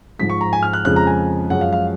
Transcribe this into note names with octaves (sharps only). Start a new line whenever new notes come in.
G#2 F3 G#3 B6
C#6
A#5
G#5
F6
F#6
F2 C#3 F3 G#3 F#6
A#5
G#5
F#2 F3 G#3 F#5
F5
F5